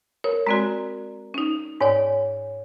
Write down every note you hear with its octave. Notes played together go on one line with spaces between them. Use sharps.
A#4 C#5
G#3 C4 F#4 D5 A#5
C#4 D#4
G#2 C#5 D5 G#5